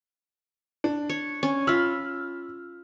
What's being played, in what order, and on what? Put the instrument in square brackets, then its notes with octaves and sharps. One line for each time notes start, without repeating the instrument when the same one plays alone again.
[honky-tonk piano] D4
[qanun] C#5
C#4
[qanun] F4 B5 [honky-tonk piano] E6 F6